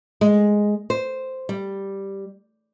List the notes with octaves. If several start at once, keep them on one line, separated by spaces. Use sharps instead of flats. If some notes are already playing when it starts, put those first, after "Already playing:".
G#3
C5
G3